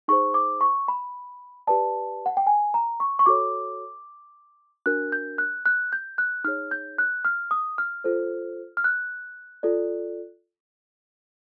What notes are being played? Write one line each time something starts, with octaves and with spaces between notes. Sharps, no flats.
D#4 G#4 C5 C#6
D6
C#6
B5
G4 B4 D5 A5
F#5
G5
G#5
A#5
C#6
C#6
F#4 A4 C#5 D6
D4 F#4 A#4 F#6
G6
F#6
F#6
G6
F#6
D#4 G#4 C#5 F6
G6
F#6
F6
D#6
F6
F4 A4 C5
F6
F#6
F4 A4 D5